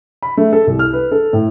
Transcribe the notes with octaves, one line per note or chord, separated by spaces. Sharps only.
B5
A3
A4
C2
F6
B4
A4
A2